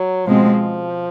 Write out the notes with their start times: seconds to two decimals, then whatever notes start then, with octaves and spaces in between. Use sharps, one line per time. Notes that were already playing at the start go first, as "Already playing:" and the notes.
Already playing: F#3
0.27 B2 F3 G#3 C4